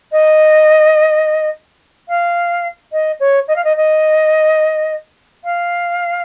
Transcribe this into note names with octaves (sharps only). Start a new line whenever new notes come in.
D#5
F5
D#5
C#5
D#5
F5
D#5
D#5
F5